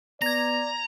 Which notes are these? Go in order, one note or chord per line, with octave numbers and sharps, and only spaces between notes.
B3 D5 A#5 G#6 A#6